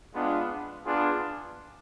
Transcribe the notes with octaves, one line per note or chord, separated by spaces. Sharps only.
G#3 B3 D4 F4
B3 D4 F4 G#4